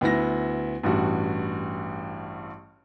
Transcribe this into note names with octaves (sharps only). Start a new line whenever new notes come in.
D2 B3 E4 A#6
A1 G2 F#4